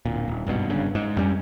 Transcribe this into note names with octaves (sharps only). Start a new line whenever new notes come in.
D1 A#2
D#1
G#1 G2 B2
G1 G2 C#3
G#2
F2 G3 C#4